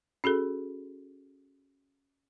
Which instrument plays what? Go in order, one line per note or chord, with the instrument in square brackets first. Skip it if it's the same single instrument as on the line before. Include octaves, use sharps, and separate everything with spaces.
[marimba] C#4 F#4 G#4 A4